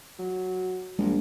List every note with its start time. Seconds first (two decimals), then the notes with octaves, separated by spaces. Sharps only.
0.19 F#3
0.98 A#1 G3 G#3